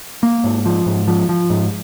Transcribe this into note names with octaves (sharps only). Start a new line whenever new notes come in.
A#3
G#2
F3
G#2
F3
F3
G#2